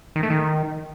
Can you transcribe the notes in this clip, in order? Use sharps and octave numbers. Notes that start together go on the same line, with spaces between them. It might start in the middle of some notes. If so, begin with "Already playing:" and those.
D#3
A3
D#3